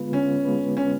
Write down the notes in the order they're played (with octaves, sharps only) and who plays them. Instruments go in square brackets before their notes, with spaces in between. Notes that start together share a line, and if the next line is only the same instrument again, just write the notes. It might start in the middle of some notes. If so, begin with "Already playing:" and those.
Already playing: [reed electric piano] D3 G#3 B3 F4 B4
[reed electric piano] D3 [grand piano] C#4
[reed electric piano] G#3 B3 F4 B4
[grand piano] C#4